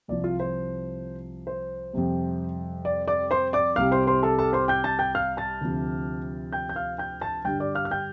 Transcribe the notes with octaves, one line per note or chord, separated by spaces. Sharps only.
C2 C3 F3 D5
F4 F5
C5
C5
F2 C3 G3
D5
D5 D6
C5 C6
D5 D6
C2 C3 G3 F5 F6
C5 C6
C5 C6
A4 A5
A4 A5
C5 C6
G5 G6
A5 A6
G5 G6
F5 F6
A5 A6
D2 C3 F3
G5 G6
G6
F5 F6
G5 G6
A5 A6
G2 D3 G3 G5 G6
D5 D6
F5 F6
F6
G5 G6